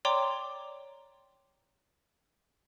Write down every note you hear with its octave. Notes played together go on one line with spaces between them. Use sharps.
C#5 D5 G5 A#5 C6 D6